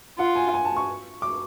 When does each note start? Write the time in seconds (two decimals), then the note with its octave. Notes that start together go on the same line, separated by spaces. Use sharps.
0.18 F4 F#5
0.36 G#5
0.54 G#5
0.65 A5
0.77 C#6
1.22 D6